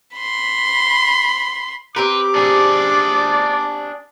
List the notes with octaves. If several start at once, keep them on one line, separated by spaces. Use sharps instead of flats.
B5 C6
C4 G4 A#4 B4 C6 D6
D4 G#4 D5